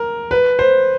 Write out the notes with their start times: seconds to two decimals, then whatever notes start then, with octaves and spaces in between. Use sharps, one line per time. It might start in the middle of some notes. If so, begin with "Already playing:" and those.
Already playing: A#4
0.31 B4
0.59 C5